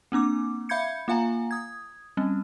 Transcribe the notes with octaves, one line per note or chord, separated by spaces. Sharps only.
A#3 C4 D4 D6
E5 F5 B5 G6 G#6 C#7
A#3 F4 F5 G#5 A#5
D#6 G#6
G3 C4 C#4